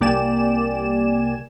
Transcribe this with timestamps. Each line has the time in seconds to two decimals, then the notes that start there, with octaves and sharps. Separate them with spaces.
0.01 C2 A#3 G4 D5 G#5 E7